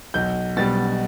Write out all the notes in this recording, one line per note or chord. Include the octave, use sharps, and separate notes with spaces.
B1 G6
B2 G3 A6